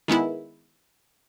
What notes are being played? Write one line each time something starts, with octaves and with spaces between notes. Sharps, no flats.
D#3 G#3 B3 E4